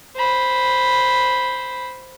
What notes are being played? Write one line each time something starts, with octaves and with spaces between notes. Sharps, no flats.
C5 B5